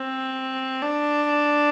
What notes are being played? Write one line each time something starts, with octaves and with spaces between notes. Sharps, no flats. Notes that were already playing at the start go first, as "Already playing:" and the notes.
Already playing: C4
D4